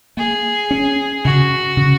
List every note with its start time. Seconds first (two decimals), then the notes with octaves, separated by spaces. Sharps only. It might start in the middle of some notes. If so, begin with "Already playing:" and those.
0.17 A#3 G#4
0.71 C#4
1.24 C#3 F#4
1.77 C#3